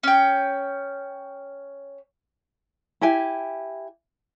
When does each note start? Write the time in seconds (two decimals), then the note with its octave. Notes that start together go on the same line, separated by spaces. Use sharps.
0.03 C#4 G5
3.01 E4 G4 G#5